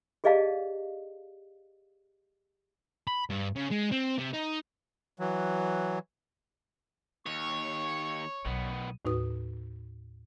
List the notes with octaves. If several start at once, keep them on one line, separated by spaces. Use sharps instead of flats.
G4 G#4 D5 D#5 F5 A5
B5
G2
C#3
G#3
C4
C3
D#4
E3 F#3
D#2 C#5 C#6
B1 D#3 B3
D#2 A2 D#4 F#4 B4 D#6